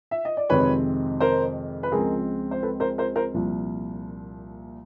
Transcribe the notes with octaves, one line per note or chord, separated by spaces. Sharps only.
E5
D#5
D5
F2 C3 D#3 G#3 C4 B4 C#5
A#4 C5
B4
C#2 C#3 F3 G#3 C4 G#4 A#4
C5
A4 B4
A#4 C5
A#4 C5
A#4 C5
C2 A#2 F3